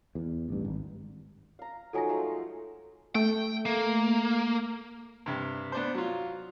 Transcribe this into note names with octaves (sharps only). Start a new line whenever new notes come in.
E2
A1 G2
G#1
F5 A#5
F3 F#3 D#4 A4 G#5 A#6
G#3 A3 F5
A3 G5
A#3
G2 C3
B3 D4 C5
F#3 F4